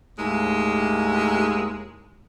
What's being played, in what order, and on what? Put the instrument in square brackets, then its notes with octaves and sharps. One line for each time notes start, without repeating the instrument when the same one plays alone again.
[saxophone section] D#2 A2 G#3